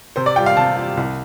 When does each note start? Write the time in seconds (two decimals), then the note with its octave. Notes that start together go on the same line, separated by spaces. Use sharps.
0.16 C3 C5
0.26 D5
0.36 G3 F4 G5
0.46 F5
0.57 C3 A5
0.77 G3 F4
0.97 C2